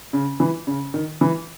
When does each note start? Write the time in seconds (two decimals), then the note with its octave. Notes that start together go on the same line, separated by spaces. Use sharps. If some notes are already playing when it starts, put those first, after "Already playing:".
0.13 C#3
0.40 E3
0.67 C#3
0.94 D#3
1.21 E3